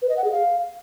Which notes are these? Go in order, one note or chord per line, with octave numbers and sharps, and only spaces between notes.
B4
D#5
F#5
G#4
F5